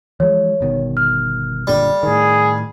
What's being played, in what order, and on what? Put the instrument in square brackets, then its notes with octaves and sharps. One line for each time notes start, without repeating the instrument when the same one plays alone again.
[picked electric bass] E3 F3 G#3 [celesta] C#5
[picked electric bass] G1 B2 D#3
[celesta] F6
[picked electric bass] F#1 A#2 D3 [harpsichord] G3
[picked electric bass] A2 D#3 [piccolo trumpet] G#4